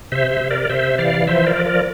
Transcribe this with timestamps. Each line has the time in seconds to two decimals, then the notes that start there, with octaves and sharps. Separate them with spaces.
0.12 C3 C5 E5
0.31 C5 E5
0.41 C3
0.50 A#4 D5
0.69 C3 C5 E5
0.98 E3 D5 F5
1.27 F3 C5 E5
1.47 A#4 D5
1.56 F3
1.66 A#4 D5